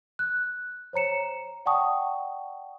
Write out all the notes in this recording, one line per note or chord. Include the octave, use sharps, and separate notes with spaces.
F#6
C5 C#5 A#5 C#7 E7
D5 F#5 G5 A5 C#6 D#6